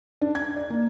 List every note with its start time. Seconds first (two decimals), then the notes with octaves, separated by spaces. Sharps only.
0.22 D4
0.35 G#6
0.56 D5
0.70 A#3